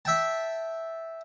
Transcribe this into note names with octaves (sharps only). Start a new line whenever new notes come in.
E5 G5 A5